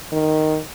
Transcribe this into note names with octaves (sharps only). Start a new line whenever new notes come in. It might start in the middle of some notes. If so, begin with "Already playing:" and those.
D#3